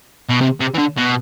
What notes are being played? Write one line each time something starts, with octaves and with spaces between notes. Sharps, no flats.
B2
C3
C3
E3
D3
B2